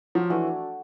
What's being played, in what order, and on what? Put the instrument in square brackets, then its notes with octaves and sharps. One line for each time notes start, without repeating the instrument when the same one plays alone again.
[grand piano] F3 [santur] F#3
[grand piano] E3 [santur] A3 D4 F#4